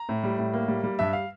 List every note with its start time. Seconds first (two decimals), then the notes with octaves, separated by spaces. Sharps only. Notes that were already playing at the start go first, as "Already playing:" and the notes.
Already playing: A#5
0.09 A2
0.24 G3
0.39 A2
0.54 A#3
0.68 G3
0.84 G3
0.99 G2 E5
1.13 F5